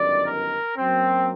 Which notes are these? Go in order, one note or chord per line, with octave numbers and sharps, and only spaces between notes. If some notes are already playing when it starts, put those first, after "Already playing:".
Already playing: G1 F#2 D#3 D5
A#4
F#2 F#3 A#3 C4